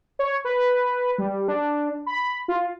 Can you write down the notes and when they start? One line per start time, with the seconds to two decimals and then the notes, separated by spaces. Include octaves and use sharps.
0.19 C#5
0.45 B4
1.18 G3
1.48 D4
2.06 B5
2.48 F4